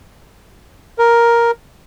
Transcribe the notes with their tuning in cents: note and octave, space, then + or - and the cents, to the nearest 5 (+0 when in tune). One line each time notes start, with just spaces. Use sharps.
A#4 +5